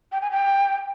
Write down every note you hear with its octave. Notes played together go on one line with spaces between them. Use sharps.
G5
G#5
G5